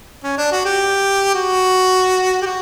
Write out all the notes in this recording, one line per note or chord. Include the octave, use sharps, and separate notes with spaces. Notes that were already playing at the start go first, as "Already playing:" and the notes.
C#4
D4
F#4
G4
F#4
G4
F#4